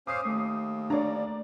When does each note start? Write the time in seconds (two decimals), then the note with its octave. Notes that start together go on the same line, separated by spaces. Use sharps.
0.07 C#4 C5 F5 D6 D#6 C7
0.25 D#2 A3
0.90 D4 C#5 D5 A#5